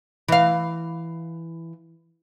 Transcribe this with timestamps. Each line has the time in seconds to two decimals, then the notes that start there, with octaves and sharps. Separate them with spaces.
0.28 E3 F5